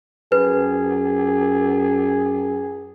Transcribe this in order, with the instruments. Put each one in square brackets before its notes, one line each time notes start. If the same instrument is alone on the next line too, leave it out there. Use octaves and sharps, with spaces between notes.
[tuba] F#2 [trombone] G#4 [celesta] B4